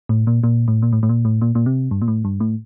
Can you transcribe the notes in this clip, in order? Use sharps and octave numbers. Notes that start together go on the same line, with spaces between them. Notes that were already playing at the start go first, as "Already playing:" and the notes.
A2
A#2
A#2
A2
A#2
A2
A2
A#2
A2
A#2
A#2
C3
G2
A#2
A2
G2
A2